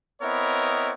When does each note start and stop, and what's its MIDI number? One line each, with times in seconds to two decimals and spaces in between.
0.22 0.92 59
0.22 0.92 60
0.22 0.92 64
0.22 0.92 70
0.22 0.92 73
0.22 0.92 75